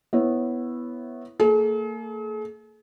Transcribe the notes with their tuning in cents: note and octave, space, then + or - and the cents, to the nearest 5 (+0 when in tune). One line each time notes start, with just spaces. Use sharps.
B3 +0 E4 +0 C#5 -15
A#3 -40 G#4 +45